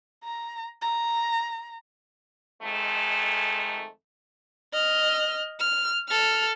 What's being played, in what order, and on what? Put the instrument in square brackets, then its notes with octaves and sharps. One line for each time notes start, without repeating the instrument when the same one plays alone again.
[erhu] A#5
A#5
[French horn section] F2 D#3 G#3 A3
[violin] D#5 F6
F6
A4 F6